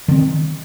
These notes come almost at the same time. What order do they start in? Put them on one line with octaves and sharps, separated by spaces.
D3 C4 F3 D#3